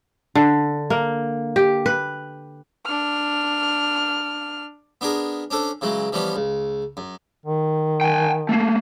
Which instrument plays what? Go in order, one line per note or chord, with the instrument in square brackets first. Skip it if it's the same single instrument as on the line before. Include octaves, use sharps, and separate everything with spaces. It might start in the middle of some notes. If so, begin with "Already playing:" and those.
[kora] D3
A#3
G4
B4
[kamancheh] D4 F6
[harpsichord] B3 D4 G#4 A#4
C#4 D4 A4 C5
C#3 E3 F#3 G#3
E3 F3 G3 B3 C#4
C#2
F#2
[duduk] D#3
[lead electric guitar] G5 G#5
A3 A#3